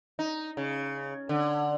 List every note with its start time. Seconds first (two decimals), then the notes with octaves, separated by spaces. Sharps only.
0.19 D#4
0.57 C#3
1.29 D3